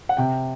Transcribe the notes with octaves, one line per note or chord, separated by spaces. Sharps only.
F#5
C3 G5